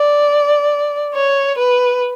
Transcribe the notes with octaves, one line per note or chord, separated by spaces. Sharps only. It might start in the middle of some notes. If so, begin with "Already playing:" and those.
Already playing: D5
C#5
B4